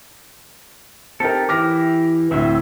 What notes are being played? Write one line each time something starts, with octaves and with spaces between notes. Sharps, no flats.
C4 D#4 G4 A4 A#4
E3 E4 G4 D6 F6 A#6
D2 A2 C4 E5